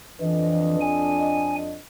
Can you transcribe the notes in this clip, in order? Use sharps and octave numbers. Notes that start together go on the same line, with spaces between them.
F2 E3 D4 D#5
G#5